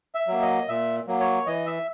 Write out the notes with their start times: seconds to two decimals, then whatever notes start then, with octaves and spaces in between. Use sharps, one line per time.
0.15 E5
0.27 F#3 A#3
0.42 D#5
0.68 A#2 E5
1.07 F#3 A#3
1.20 C#5
1.46 E3 D#5
1.66 E5